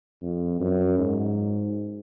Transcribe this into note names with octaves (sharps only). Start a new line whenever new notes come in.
F2
F#2
G#2